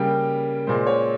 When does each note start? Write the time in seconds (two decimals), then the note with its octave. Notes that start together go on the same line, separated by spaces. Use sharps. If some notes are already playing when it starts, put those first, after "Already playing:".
Already playing: C#3 G3 A#3 G5
0.67 A#2 G#3 C5
0.87 C#5